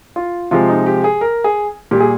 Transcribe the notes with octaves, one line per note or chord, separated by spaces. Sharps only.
F4
C3 F3 G#3 F4
D#4
G4
G#4
A#4
G#4
A#2 G3 G4
G#4